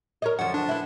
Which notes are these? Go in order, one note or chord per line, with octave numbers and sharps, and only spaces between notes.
A#4 C#5 D#5
F#2 D3 F3 F#5
D4
E4 B4